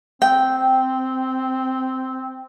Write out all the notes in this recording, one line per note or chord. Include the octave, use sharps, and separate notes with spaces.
C4 G5